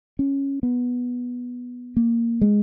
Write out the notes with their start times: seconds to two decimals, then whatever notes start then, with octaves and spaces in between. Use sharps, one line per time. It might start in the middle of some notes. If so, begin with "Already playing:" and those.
0.19 C#4
0.63 B3
1.97 A#3
2.41 G#3